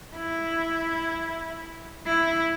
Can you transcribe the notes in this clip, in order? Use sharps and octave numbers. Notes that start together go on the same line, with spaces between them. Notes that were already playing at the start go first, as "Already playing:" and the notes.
E4
E4